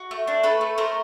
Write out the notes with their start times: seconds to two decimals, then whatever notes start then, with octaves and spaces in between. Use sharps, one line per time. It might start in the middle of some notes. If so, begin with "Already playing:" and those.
Already playing: F#4
0.11 A3
0.27 D4
0.43 A3 A4 B4
0.61 A3
0.78 A3 A#4 C5